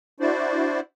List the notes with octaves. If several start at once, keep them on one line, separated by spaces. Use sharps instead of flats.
D4 E4 F#4 C5 D5